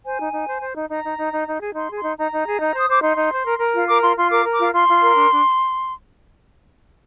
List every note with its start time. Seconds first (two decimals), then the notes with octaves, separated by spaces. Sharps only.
0.05 C5 G#5
0.19 D#4
0.34 D#4
0.48 C5
0.62 C5
0.75 D#4
0.90 D#4 A#5
1.05 D#4
1.18 D#4
1.33 D#4
1.48 D#4
1.61 G#4
1.75 D#4 C6
1.90 G#4
1.97 C6
2.03 D#4
2.18 D#4 A#5
2.32 D#4
2.47 G#4
2.60 D#4
2.75 C5 D#6
2.89 C5 D6
3.02 D#4 C6
3.17 D#4
3.32 C5
3.45 A#4
3.59 A#4
3.74 F4
3.88 A#4 D6
4.02 F4 C6
4.17 F4 C6
4.30 A#4 D6
4.44 A#4
4.53 D6
4.60 F4
4.73 F4 C6
4.88 F4
5.02 A#4
5.16 D4
5.30 D4